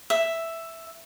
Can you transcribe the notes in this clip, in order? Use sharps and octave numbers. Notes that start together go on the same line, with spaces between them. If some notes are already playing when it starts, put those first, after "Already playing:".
E5